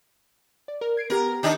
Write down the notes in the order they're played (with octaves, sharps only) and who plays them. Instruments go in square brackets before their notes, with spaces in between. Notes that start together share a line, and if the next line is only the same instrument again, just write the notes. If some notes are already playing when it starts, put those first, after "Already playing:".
[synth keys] D5
A#4
G#6 C7 D7
[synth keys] B3 G4 [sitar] A#4
[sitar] D#3 D4 D#4